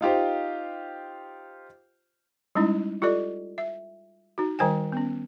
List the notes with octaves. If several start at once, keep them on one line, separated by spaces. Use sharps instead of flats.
D#4 F4 G4 C5
G3 G#3 C#4 D#4 E4
F4 G4 A4 D5 D#5
E5
D#4 F#4
D#3 G3 C5 G5 G#5
B3 C#4